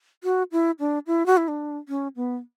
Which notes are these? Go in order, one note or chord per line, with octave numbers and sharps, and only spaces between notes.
F#4
E4
D4
E4
F#4
E4
D4
C#4
B3